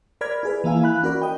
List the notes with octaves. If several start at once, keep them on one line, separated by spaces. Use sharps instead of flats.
A#4 D5 B5 F6 G#6
E4 G#4 B4
E3 A#3 E4 F5 G#5
F5 B5 F#6
C#4 F#4 A#4 D5 B5
D#5 G5